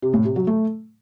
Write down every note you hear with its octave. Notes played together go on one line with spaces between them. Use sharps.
C3
A2
C3
F#3
A3